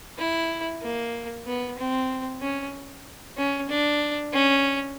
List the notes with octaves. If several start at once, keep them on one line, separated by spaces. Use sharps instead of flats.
E4
A#3
B3
C4
C#4
C#4
D4
C#4